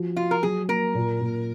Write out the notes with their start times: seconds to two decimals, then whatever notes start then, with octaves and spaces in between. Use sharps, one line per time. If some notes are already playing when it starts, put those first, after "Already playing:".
Already playing: F3 F#4
0.16 F4 F#4
0.31 A#4
0.43 F#3 G#4
0.68 A#3 A#4
0.94 A#2
1.21 A#2